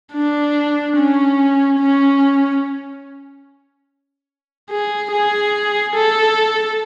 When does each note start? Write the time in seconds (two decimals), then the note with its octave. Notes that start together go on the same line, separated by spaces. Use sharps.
0.13 D4
0.97 C#4
1.79 C#4
4.71 G#4
5.12 G#4
5.95 A4